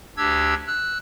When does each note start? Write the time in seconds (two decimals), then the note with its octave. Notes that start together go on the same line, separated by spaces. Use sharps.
0.17 D2 D4 G4 E6 G#6
0.67 E6 F#6